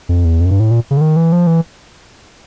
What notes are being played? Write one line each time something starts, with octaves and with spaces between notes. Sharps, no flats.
F2
E2
F2
F#2
G2
A2
A#2
C#3
D3
D#3
E3
F3
E3